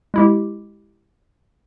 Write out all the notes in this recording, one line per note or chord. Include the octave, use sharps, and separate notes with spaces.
G#3 E4 G4